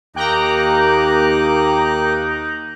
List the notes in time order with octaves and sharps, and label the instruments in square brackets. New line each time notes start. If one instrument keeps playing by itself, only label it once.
[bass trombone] D#2 [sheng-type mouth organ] A#3 D6 F#6 [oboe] D#4 [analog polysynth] G5 A#5